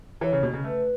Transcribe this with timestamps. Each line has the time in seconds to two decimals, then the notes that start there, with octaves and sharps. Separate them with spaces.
0.21 E3 C#5
0.33 C#3
0.43 B2
0.53 C#3
0.64 A3 B4